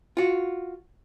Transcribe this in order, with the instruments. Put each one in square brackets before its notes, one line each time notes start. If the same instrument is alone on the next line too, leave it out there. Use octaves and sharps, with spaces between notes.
[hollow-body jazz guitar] F4 F#4